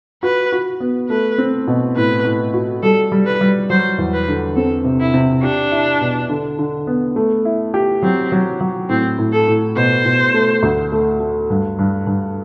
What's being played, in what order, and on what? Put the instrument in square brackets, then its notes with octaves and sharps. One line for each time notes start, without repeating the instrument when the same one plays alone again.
[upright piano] F#4 [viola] B4
[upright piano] F#4
B3
[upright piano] A3 [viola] B4
[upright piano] C4
B2
[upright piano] A2 [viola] B4
[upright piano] A2
F#4
[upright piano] G3 [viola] A4
[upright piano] G3
[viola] B4
[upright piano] G3
[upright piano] F#3 [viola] C5
[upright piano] E2
[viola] B4
[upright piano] D3
[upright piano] C4 [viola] A4
[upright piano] C3
[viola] E4
[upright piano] C3
[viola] D4 [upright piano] G4
[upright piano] E4
B2
D3
D3
B3
A3
E4
G4
[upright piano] F#3 [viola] C4
[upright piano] F#3
F#3
[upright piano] A2 [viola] C4
[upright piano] A2
[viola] A4
[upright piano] A2
[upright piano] B2 [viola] C5
[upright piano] B2
A3
D2
A3
A3
G2
G2
G2